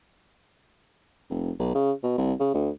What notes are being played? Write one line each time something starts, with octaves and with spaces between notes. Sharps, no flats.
F1
B1
C#3
B2
C2
C#3
D2